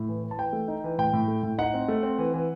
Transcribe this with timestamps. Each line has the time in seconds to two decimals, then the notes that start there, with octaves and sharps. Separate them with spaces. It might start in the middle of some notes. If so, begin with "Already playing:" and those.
Already playing: A2
0.09 E3
0.23 E3
0.31 A5
0.38 E3 G5
0.53 A3
0.68 D#4
0.84 E3
0.98 A2 G5
1.13 A2
1.28 A3
1.43 A2
1.58 D#4 F#5
1.74 C4
1.88 A3
2.03 C4
2.18 E3
2.34 E3